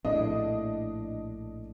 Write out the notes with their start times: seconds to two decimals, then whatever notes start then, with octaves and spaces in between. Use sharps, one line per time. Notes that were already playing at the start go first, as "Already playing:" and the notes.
0.05 A#1 A2 D4 D#5